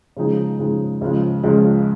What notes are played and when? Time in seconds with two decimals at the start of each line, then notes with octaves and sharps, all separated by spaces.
0.17 C#3 F3 G#3 D#4 G#4
0.59 C#3 F3 G#3 D#4 G#4
1.01 C#2 C#3 F3 G#3
1.43 C#2 C#3 F3 G#3